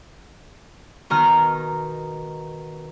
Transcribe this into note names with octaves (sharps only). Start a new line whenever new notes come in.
B2 D#3 A#5 F6